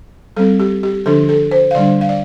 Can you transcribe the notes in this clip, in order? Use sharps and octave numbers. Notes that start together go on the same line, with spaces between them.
G3 C4 A4
G4
G4
D3 F3 D4 A4
A4
C5
F5
D3 G3 D4 D5
F5
D5